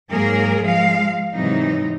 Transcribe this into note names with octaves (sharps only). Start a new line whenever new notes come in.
G#2 F#3 A#3 G#4 A#4
F3 G#3 F5
G#2 C3 E3 F#3 D#4